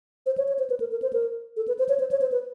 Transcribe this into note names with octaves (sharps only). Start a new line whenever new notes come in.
C5
C#5
C#5
C5
B4
A#4
A#4
C5
A#4
A4
B4
C5
C#5
C5
C#5
C5
B4